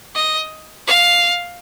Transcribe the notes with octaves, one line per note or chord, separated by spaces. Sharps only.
D#5
F5